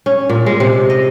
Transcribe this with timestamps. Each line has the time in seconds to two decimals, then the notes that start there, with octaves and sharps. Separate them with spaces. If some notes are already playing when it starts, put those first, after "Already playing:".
0.06 C#4
0.29 A#2
0.46 G#3
0.60 C3
0.90 D#5